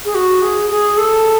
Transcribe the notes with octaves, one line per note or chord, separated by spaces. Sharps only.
G#4
F#4
G#4
G#4
A4